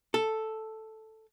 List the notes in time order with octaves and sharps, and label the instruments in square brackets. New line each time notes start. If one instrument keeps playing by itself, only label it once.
[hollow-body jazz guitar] A4